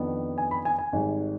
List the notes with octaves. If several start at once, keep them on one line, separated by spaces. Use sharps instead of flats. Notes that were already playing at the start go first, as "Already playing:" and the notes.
Already playing: F2 D#3 B3 D4
G#5
B5
G#5
G#5
G#1 G#2 G3